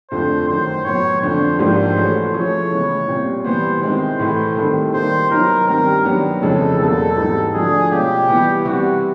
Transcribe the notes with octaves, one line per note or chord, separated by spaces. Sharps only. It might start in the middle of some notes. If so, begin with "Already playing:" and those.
F2 D3 F3 A3 C5
F#2 D#3 F#3 C5
A2 F#3 B3 C#5
F2 D3 F3 C5
G#2 F3 A#3 D4 G4 C5
E3 A3 C#4 F#4
F3 A3 C#4 E4 G#4 C#5
C#3 E3 G#3 B3
A#2 G3 C4
E3 G3 B3 C5
D#3 G#3 C4 E4 C5
A2 E3 A3
D#3 G3 C4 E4 A4
C3 D#3 G3 A#3 C5
F#3 B3 D#4 A#4
G2 D#3 G3 C4 A#4
D#3 F#3 B3 D4
F2 C#3 E3 G#3 C#4 A4
E2 B2 F#3 A#3 A4
G#2 E3 G3 C4 D#4
D3 F3 A3 D4 F#4 G#4
B2 G#3 C#4 F4 G4
E3 G3 B3 E4
E3 G3 C4 E4 F#4 G4